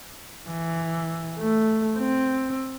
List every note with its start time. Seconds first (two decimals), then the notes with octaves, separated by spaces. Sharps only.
0.48 E3
1.38 A3
1.97 C4